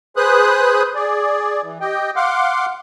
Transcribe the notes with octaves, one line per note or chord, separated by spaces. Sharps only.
G#4 B4 C5 D#6 F#6
G#4 D5
E3
G4 D#5 G5
F5 F#5 C6 D6